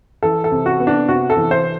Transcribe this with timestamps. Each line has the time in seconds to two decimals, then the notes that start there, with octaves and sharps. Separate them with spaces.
0.23 E3 A4
0.44 A4
0.51 C3
0.66 F#4
0.80 B3
0.87 D4
1.09 C3 F#4
1.30 A4
1.37 E3
1.51 C5